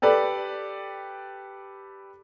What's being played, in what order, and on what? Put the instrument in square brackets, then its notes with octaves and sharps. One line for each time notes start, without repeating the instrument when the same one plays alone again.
[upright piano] G4 A4 B4 D5